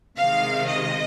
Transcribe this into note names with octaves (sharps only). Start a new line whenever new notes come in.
C3 D#3 G#3 F5
D#5